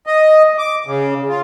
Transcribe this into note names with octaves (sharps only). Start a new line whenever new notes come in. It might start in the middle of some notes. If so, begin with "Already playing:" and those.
D#5
D6
C#3
F4